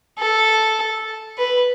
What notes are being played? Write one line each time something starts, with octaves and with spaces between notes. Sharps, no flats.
A4
B4